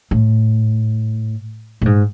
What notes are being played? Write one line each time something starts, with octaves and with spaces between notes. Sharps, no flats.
A2
A2
G#2